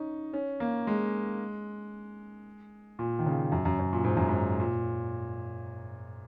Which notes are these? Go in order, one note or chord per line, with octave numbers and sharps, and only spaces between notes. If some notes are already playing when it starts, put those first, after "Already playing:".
Already playing: C#4 D#4
C#4
A#3
G#3
A#2
D#3
C#3
F#2
F#2
F#2
A#2
G#2
F#2
G#2
A#2